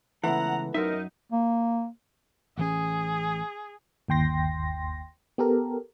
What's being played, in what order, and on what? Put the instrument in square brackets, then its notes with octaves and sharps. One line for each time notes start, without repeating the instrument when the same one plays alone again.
[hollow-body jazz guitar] C#2 E3 [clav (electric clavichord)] A3 B3 E4 [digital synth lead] F#5 [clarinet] A#5
[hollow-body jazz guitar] F#2 E5 [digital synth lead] D#4 [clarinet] A#4
[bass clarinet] A#3
[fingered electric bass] A1 E3 C#4 [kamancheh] G#4
[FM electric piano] G1 D#2 G5 C6 A#6
B3 G4 A4 A#4